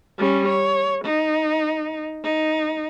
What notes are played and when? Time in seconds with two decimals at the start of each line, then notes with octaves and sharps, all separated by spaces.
0.18 G3 C#4
0.49 C#5
1.05 D#4
2.24 D#4